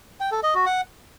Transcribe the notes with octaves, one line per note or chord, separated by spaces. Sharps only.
G5
A4
D#5
F#4
F#5